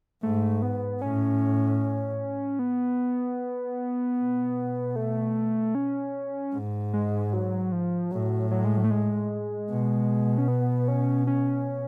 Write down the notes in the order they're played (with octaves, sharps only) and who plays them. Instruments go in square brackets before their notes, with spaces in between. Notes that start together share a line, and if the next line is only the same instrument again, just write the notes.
[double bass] G#2 [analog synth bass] A3
[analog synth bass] B3
[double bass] A2 [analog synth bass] C#4
[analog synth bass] B3
[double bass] B2
[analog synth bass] A3
C#4
[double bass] G#2
[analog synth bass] G#3
F#3
F3
[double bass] A2 [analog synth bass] F#3
[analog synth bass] F#3
G#3
F#3
A3
G#3
[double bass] B2
[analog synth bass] C#4
B3
C#4
C#4